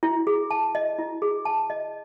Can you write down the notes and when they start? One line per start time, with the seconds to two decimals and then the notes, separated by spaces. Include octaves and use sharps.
0.03 E4
0.27 G#4
0.51 A5
0.75 D#5
0.99 E4
1.22 G#4
1.45 A5
1.70 D#5